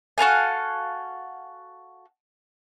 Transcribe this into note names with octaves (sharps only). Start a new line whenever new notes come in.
F#4 A4 F5 G#5